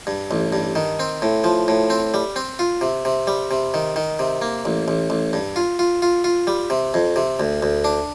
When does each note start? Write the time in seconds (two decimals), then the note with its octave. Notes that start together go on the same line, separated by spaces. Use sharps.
0.07 G2
0.31 A1
0.53 G2
0.75 D#3
1.00 C4
1.22 A2
1.44 F3
1.68 A2
1.90 C4
2.14 G3
2.36 C4
2.59 F4
2.81 C3
3.05 C3
3.27 G3
3.51 C3
3.74 D#3
3.96 D#3
4.19 C3
4.42 A#3
4.65 A1
4.88 A1
5.10 A1
5.33 G2
5.56 F4
5.79 F4
6.02 F4
6.24 F4
6.47 G3
6.70 C3
6.94 F2
7.16 C3
7.40 D2
7.63 D2
7.84 D4